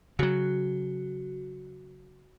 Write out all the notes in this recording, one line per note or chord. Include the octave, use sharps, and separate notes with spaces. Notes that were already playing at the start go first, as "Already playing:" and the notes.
C#3 F#3 F#4